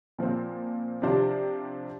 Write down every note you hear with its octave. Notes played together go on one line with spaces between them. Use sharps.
A#2 F3 C4
C3 F3 D4 G4 C5